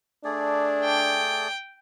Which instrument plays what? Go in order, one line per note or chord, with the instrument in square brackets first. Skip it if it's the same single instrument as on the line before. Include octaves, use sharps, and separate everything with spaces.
[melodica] A3 G#4 D5 [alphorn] D4
[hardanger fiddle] G5